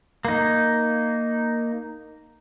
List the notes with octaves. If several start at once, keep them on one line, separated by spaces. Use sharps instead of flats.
A#3 D#4